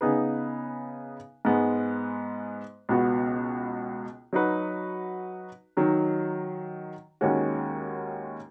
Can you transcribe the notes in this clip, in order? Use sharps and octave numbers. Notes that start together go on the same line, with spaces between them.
C#3 B3 D#4 G#4 B4
G#2 G#3 B3
C#2 B2 B3 F#4
F#3 D#4 F#4 B4
D#3 F#3 D#4
D#2 D#3 G#3 C#4 F#4